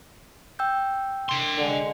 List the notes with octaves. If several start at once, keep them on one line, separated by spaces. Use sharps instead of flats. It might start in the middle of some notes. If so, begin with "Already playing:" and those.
G5 E6 G6
D4 C6
D3 G#3